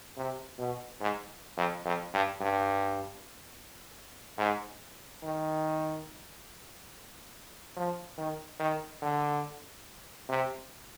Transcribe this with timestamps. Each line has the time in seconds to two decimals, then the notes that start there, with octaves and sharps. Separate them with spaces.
0.17 C3
0.59 B2
1.01 G#2
1.57 F2
1.85 F2
2.14 G2
2.41 G2
4.38 G#2
5.23 D#3
7.76 F3
8.18 D#3
8.60 D#3
9.02 D3
10.29 C3